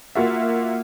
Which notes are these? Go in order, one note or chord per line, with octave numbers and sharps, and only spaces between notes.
A#3 F4 F#4 E5